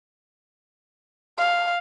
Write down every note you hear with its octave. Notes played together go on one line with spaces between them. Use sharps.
F5